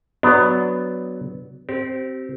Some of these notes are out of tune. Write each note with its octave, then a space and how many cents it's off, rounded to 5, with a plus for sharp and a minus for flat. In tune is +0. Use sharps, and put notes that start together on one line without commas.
F#3 +0 B3 +10 D4 +0
C4 +0 G4 -30